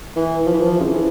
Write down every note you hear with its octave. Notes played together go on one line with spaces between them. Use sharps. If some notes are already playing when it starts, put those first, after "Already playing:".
E3
F3
E3
F3
C#3
E3